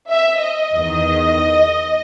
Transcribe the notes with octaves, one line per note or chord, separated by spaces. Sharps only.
E5
D#5
E2 D#3